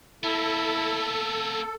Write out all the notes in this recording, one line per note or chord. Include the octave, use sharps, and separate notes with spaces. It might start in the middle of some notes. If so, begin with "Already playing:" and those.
A#3 B3 E4 A4